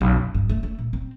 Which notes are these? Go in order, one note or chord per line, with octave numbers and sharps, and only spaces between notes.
B1
F#2
G2
A3
A3
A#2
C4